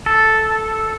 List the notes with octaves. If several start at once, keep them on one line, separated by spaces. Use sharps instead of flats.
A4